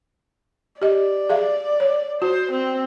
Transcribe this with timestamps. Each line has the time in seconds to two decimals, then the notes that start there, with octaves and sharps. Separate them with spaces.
0.82 G4 D5 D#5
1.29 G#4 E5 F5
1.80 C#5
2.22 F#4 C5
2.51 C4